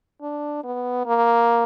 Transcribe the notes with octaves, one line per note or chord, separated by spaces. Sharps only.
D4
B3
A#3